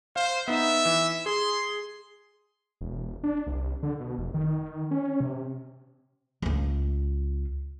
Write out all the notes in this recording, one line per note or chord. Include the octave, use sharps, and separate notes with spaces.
C5 F5
B3 D#4 E5
E3
G#4 C6
E1
D4
C2
D3
B2
F1
D#3
C#4
C3
C#2 F4